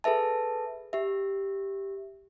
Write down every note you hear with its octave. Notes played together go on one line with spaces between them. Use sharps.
G#4 A4 B4 E5 A5
G4 E5